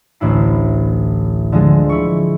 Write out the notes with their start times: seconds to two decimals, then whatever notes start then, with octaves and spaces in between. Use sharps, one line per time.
0.20 A1 D2 A2 E4 C7
1.52 D3 F3 G#3
1.89 E4 C#6